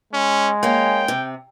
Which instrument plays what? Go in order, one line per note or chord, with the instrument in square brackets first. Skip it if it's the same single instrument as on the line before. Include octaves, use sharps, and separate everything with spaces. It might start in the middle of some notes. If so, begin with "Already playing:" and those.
[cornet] G#3 [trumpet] C#4
[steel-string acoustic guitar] A#3 C#4 [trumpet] G5
[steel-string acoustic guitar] C3